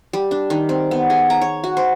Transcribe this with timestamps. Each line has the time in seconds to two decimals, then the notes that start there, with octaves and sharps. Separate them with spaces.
0.13 G3
0.31 D4
0.50 D#3
0.69 C4
0.91 B3
1.10 G#4
1.30 A#5
1.41 C#5
1.64 F#4
1.77 C5